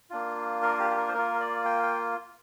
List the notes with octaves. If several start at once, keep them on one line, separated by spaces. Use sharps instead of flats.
A#3 D4 F4
A#4
G4
G4
A#4
C5
A#3 F4 A#4
D5
G5
G5